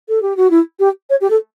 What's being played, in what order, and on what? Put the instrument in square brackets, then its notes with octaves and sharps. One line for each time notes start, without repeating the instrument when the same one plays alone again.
[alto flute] A4
G4
F#4
E4
G4
C#5
G4
A4